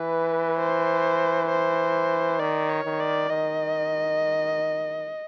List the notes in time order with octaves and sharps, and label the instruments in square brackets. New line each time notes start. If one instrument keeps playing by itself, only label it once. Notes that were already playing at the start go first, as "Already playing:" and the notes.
Already playing: [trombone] E3 [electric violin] B4
[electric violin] C5
C5
[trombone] D#3 [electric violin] D5
[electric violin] C#5
[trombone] D#3
[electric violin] D5
[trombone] D#3 [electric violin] D#5